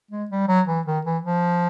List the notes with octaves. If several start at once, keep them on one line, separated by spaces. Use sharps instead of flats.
G#3
G3
F#3
E3
D#3
E3
F3